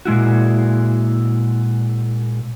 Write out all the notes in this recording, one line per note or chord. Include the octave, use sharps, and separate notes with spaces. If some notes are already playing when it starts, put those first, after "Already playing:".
A#2 G#3 E4 F#4